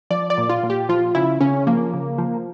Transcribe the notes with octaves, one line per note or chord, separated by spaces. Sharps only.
F3 D5
D5
A#2
F4
A#2
G4
F3 F4
C#3 E4
C#3 C#4
F3 A#3
C#3
F3